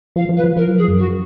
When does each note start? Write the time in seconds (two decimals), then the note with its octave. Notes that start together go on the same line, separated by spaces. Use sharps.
0.16 F3 F5
0.29 F3
0.37 B4
0.44 F3
0.57 F3 A#4
0.67 F#3
0.78 F3 G#4
0.88 F#2
0.98 F#4